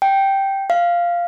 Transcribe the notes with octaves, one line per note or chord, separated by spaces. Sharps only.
G5
F5